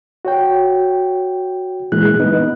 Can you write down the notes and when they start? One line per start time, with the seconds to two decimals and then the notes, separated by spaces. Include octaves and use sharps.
0.25 F#4 C#5 G5
1.92 A#2 E3 G#3 F#6
2.20 B3 D#4